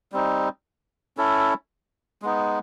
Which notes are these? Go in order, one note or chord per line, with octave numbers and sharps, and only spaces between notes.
G3 C4 D#4
C#4 E4 A4
G#3 B3 D#4